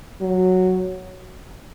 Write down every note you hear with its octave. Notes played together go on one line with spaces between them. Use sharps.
F#3